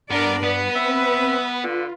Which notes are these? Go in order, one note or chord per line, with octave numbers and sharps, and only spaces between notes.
G2 B3 D4 A#4 D5
B3 B4
C4 E5
D3 F4